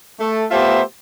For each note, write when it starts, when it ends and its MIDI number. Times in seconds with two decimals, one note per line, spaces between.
0.20 0.44 57
0.51 0.81 57
0.51 0.81 59
0.51 0.81 65
0.51 0.81 67
0.51 0.81 72
0.51 0.81 76